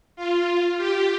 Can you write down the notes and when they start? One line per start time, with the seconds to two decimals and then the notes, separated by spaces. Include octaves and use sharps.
0.16 F4
0.77 G4